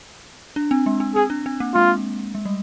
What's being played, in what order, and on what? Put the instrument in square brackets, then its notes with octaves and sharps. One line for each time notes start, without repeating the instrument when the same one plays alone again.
[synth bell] D4
C4
G#3
C4
[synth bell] C4 [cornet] G#4
[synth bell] D4
C4
A#3
[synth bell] G#3 [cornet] F4
[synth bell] G#3
G3